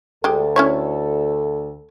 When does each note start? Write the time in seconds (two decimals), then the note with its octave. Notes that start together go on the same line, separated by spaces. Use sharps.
0.24 D2 G#3 G4 A4
0.56 C#4 E4 C#5